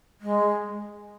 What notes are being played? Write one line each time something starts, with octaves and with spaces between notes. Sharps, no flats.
G#3